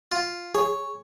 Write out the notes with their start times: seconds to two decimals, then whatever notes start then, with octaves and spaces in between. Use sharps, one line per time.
0.12 F4
0.55 G#4 C#5